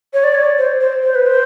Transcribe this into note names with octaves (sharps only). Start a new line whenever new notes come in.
C#5
D5
C#5
C5
C5
C5
B4
C5